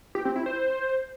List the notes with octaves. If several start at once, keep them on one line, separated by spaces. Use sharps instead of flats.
G4
C4
E4
C5